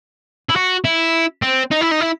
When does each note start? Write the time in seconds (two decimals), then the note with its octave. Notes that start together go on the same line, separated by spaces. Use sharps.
0.49 E4
0.56 F#4
0.85 E4
1.42 C4
1.71 D#4
1.81 E4
1.92 D#4
2.01 E4